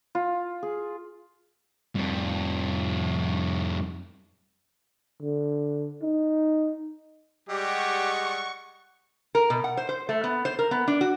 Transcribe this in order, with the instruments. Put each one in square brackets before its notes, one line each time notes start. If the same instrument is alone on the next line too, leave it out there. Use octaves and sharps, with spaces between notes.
[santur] F4
G#4
[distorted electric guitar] F2 G3
[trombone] D3
D#4
[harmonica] G3 G#3 [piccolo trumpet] G4 [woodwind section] D5 D#5 F#5 [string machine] C#6
[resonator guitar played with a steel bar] A#4
B2
F#5
C5
C5
A3
B3
C5
A#4
B3
D4
F#4